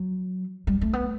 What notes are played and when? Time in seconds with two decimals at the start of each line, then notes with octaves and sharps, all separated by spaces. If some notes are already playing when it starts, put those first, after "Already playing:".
Already playing: F#3
0.67 G3
0.81 A3
0.93 B3